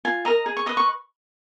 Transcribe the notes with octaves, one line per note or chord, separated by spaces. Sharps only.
F4 G#5
A#4 D#5 A#5
G#4
C#6
B4 D#5 D#6
C#6